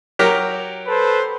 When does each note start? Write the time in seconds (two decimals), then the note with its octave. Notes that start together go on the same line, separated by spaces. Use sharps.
0.19 F#3 G4 A#4
0.86 A4 B4 C5